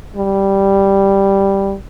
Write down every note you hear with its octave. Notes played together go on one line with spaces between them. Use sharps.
G3